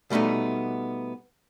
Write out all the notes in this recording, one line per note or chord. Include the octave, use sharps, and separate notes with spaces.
B2 G3 A3 B3 D#4